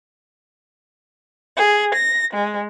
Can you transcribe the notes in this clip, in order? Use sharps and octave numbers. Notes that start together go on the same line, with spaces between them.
G#4
A#6
G#3